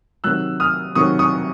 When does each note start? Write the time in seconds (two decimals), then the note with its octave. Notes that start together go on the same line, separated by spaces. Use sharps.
0.24 C3 D#3 F#3 E6 F#6
0.60 D#6 F6
0.95 C3 D#3 F#3 C#6 D#6
1.19 C#6 D#6